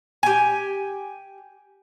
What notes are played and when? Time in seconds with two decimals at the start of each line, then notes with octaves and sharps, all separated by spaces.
0.23 G4 G#5